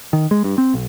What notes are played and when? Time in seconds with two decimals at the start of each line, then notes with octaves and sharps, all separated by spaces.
0.13 D#3
0.31 G#3
0.44 G2
0.58 C4
0.74 B1